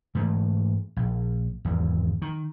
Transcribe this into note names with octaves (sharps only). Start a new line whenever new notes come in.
G#2 E3 A3
A#1
G#1 E2
D#3